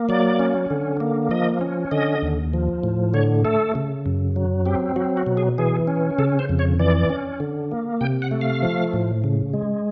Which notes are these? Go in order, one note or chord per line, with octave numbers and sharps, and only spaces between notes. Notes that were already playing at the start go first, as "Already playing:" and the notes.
Already playing: A#3
F#3 D5
C#4
D3
A#3
F3 D#5
C#4
D3 D#5
D#2
F3
A2
D3 C#5
A3 A4
C#3
F#2
F#3
C4 G4
F#3 F#4
F#4
B2
G#4
E3 G#4
C#4
C#3 A4
C5
F2
C#5
E3 D5
C#4
D3
A#3
C3 G5
F#5
A3
F5
F3
A2
C#3
G#3